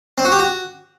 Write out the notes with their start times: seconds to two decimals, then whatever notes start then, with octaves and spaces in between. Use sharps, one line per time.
0.18 C4
0.25 F#4
0.32 G4
0.39 F#4